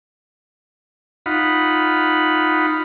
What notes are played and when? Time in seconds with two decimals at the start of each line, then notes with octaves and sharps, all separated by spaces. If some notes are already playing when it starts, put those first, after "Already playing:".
1.26 D#4 F4 F#5 B5